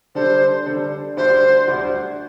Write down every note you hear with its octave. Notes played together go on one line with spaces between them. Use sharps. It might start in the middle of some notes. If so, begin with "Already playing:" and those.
D3 G3 D4 A4 C5
D3 G3 D4 A4
D2 D3 G3 D4 F#4 C5
D2 D3 G3 D4 F#4